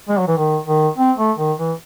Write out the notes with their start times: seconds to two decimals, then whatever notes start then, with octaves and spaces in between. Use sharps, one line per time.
0.09 G#3
0.19 F#3
0.27 E3
0.37 D#3
0.67 D#3
0.98 C4
1.18 A3
1.38 D#3
1.58 E3